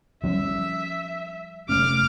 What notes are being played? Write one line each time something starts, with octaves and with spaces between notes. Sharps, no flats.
F3 G3 C#4 E5
F1 A3 C#4 D6 F6